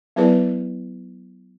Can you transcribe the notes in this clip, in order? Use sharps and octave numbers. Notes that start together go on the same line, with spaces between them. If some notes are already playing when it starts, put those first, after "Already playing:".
F#3 B3 E4 G#4 B4 D5